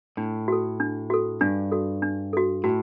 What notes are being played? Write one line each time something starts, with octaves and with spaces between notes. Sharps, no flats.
A2 D4
F#4 A4
D4
F#4 A4
G2 D4
F#4 A4
D4
F#4 A4
A2 F#4